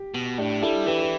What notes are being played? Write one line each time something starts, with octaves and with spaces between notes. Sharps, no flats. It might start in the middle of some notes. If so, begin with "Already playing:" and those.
Already playing: G4
B2
A2 D4 G4
G3 E4 A4
E3 G4 B4
G4